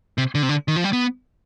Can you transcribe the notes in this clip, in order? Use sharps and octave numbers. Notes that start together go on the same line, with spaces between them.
C3
D3
C3
D3
D#3
F3
G3
B3